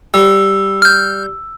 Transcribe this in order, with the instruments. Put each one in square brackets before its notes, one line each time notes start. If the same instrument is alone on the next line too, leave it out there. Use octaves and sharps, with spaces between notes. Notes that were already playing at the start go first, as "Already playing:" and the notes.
[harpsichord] G3 [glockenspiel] E6
[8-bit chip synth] F6 G6